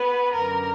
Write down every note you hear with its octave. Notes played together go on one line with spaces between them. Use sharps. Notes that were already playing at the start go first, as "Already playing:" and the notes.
Already playing: B3 B4
F#2 D3 A#4